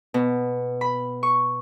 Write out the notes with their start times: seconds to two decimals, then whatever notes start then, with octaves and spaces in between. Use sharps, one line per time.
0.14 B2
0.81 B5
1.23 C#6